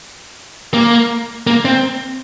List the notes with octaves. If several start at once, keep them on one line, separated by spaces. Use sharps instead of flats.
A#3
A#3
C4